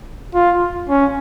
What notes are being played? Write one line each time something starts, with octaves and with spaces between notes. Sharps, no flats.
F4
C#4